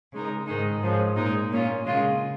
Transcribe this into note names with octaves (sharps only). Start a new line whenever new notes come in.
C#3 G#3 D#4 A#4
G#2 D#3 G#3 D#4
G#2 F3 G#3 C#4
A#2 G#3 D#4 A#4
A#2 A#3 C#4 F4
C#3 G#3 F4